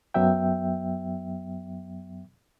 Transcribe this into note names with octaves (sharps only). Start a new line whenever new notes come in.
F#2 F#3 B3 E5 G5